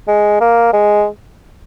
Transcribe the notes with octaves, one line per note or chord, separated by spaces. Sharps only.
G#3
A#3
G#3